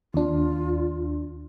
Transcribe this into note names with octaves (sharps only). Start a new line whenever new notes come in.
D#2 D4 F4